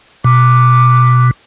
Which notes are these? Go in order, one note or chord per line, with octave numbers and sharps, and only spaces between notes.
B2 D6